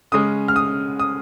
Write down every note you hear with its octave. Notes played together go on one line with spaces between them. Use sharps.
C#3 G#3 C#4 D#6
F6
D#6
D#6